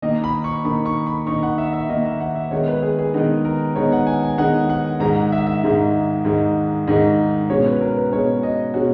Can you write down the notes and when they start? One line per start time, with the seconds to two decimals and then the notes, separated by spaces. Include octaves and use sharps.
0.02 D#3 A#3 D#4 D#5
0.24 B5
0.44 C#6
0.64 D#3 A#3 D#4 B5
0.85 C#6
1.07 B5
1.27 D#3 A#3 D#4 C#6
1.43 F#5
1.58 E5
1.73 E5
1.89 D#3 A#3 D#4 D#5
2.05 E5
2.21 F#5
2.35 E5
2.51 D#3 G#3 B3 D#4 C#5
2.68 B4
2.82 G#4
2.99 G#4
3.14 D#3 G#3 B3 D#4
3.45 A#4
3.75 D#3 G#3 B3 D#4 C#5
3.92 F#5
4.07 G#5
4.23 G#5
4.38 D#3 G#3 B3 D#4 F#5
4.70 F#5
5.00 G#2 D#3 G#3 D#4 A#5
5.16 F#5
5.32 E5
5.47 E5
5.63 G#2 D#3 G#3 D#4
6.25 G#2 D#3 G#3 D#4
6.88 G#2 D#3 G#3 D#4 D#5
7.49 B2 G#3 C#4 C#5
7.66 B4
7.81 A#4
7.97 B4
8.12 B2 G#3 C#4 C#5
8.43 D#5
8.74 B2 G#3 C#4 F#4